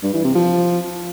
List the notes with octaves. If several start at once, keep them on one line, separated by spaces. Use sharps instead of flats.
G2
E3
C3
F3